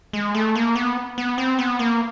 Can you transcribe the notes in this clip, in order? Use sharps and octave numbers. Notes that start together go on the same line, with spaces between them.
G#3
A3
A#3
B3
B3
C4
B3
A#3